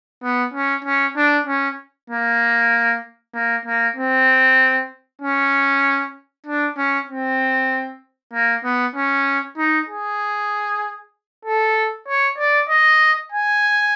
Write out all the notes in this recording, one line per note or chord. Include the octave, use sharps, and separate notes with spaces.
B3
C#4
C#4
D4
C#4
A#3
A#3
A#3
C4
C#4
D4
C#4
C4
A#3
B3
C#4
D#4
G#4
A4
C#5
D5
D#5
G#5